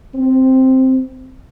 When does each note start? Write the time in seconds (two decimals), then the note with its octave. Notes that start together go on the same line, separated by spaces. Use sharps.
0.14 C4